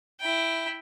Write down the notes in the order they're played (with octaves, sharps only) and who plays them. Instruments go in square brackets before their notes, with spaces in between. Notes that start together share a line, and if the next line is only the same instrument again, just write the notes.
[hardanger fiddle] E4 G5